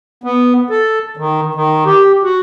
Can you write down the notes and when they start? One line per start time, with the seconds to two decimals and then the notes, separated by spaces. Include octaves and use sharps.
0.24 B3
0.70 A4
1.17 D#3
1.55 D#3
1.86 G4
2.23 F#4